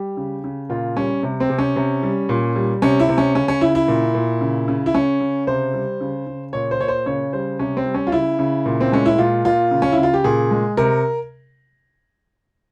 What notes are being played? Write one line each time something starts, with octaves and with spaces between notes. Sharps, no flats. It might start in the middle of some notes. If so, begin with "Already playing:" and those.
Already playing: G3 G4
C#3
C#3
A#2 F4
G3 C#4
C3
C4
C3
C#4
C3
G3
A#2
G3
C3 C#4
E4
C3
C#4
C#3 C#4
C#4
C#3 E4
E4
A#2
A#2
C#3
C#3
E4
C#3 C#4
C#3
C3 C5
G3
C#3
C#3
A#2 C#5
C5
A#2 C#5
C5
C#3 C#5
G3 C5
C3 C#4
C4
G3
C#4
F4
C#3 E4
C#3
A#2
C4
G#3 C#4
E4
A#2 F4
A#2 F4
C#3
C#4
E4
C#3
F4
G4
A#2 G#4
G#3
C3 A#4